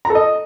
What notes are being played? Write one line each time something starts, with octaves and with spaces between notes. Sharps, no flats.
A#5
A4
D#5